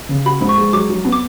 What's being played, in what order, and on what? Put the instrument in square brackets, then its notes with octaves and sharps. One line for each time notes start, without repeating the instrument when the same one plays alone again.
[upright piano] C#3
[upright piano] F#4 [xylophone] B5
[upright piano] G#2 [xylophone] B5
[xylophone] C#6
[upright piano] G#3
[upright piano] F#3 [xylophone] D6
[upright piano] F#3
B3
[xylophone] D6